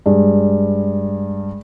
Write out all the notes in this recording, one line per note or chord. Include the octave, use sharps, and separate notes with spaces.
G2 G#3